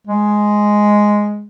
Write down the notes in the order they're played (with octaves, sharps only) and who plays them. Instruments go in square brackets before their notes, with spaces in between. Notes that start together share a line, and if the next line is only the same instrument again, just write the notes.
[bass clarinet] G#3